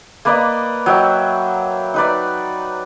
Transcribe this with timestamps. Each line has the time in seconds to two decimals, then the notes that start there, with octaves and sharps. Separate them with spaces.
0.25 A#3 B4 D5 D#5
0.86 F#3 D#5 E5 G5
1.94 D#4 B4 D5